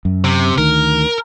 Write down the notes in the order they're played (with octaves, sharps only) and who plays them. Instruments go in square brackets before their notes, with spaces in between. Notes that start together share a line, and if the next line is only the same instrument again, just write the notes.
[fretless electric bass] F#2
[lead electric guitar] C3
[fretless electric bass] D2 D#3 [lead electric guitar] A#4